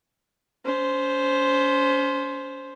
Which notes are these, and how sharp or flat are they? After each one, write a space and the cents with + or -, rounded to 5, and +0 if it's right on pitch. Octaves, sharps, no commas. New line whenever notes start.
C#4 +35 C5 +0